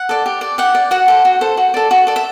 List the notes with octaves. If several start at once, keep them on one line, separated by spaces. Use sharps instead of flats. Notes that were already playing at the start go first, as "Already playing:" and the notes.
Already playing: F#5
A4 D5
G4
D5
G4 F#5
D5
F#4 F#5
A4 C5
F#4
A4 C5
F#4
A4 D5
F#4
A4 D5
E5